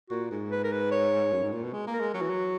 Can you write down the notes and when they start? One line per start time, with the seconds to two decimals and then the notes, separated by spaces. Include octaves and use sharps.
0.10 A#2 F#4
0.31 G#2
0.51 B4
0.64 A#4
0.72 B4
0.91 C#5
1.32 F#2
1.43 G#2
1.53 A#2
1.63 B2
1.73 G#3
1.87 A#3
1.93 A#4
2.00 G#3
2.14 F#3 F#4
2.22 E3
2.30 F#3